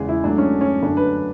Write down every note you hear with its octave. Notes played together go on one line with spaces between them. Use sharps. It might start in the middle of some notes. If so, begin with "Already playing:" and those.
Already playing: E2 C#3 G#3 G#4
E4
G#2 F#3 A3 D4
C#4
C#4
F#2 D3 F#3 A3 D4
B4